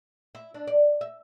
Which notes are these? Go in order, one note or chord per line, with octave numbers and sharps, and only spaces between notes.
E4
D4
D5
E5